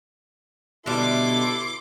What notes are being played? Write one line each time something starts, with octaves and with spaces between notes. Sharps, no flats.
B2 D3 G3 E4 A4 E5 C6 D6